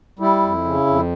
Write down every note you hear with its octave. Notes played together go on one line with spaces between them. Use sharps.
G3 E4
F2
C#3
F2